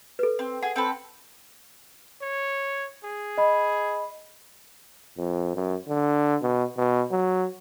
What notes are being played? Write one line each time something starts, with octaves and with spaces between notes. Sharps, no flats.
A4 B4
C4
G#4 F#5
C4 A4 B4
C#5
G#4
D#5 B5
F2
F#2
D3
B2
B2
F#3